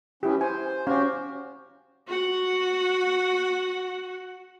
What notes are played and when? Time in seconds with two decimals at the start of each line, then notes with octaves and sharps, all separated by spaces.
0.23 F#3 B3 C#4 E4 G4
0.41 C5 G#5
0.87 C#4 F#4 G4 C5 F5
2.07 F#4 F#5